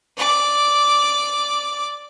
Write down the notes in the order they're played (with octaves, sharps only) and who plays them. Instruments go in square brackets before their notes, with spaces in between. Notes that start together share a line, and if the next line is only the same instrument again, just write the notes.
[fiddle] D5 D6